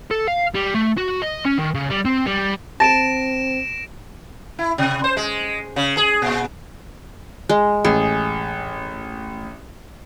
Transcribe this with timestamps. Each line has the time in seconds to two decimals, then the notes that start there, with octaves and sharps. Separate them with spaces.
0.11 A4
0.28 F5
0.54 G3
0.74 A3
0.98 F#4
1.22 D#5
1.45 C#4
1.58 D#3
1.74 C#3
1.90 G3
2.05 C4
2.26 G3
2.80 C4 A5 A#6 D7 E7
4.59 E4
4.78 C3
5.04 C5
5.17 G#3
5.76 C#3
5.97 G#4
6.22 A#2
7.49 G#3
7.85 A1 G#4